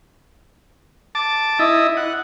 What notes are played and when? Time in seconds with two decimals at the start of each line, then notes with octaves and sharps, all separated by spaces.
1.15 A5 D6
1.59 E4 D#5
1.97 F#5